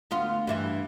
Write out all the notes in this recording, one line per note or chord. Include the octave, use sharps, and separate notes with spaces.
D2 B3 F4
G2 E3 E5